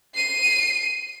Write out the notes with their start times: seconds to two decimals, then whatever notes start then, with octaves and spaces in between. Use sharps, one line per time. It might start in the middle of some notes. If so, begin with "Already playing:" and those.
0.15 C7 D#7